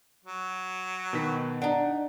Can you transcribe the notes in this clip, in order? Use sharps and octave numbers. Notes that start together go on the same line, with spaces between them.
F#3
B2 D#3 B6
D4 D#4 F#5